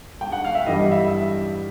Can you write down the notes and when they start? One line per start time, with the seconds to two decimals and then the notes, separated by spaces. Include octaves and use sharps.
0.21 G5
0.32 F#5
0.45 F5
0.55 E5
0.66 G2 E3 G3 D#5
0.92 E5